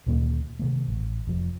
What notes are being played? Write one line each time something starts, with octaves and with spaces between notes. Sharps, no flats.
D2 A#2 D#3 A#3
C3 D#3 A3
A1
F1 F3